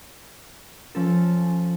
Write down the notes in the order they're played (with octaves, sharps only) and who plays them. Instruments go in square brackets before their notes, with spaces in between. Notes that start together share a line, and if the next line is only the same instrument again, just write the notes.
[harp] F3 A4 [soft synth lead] C#4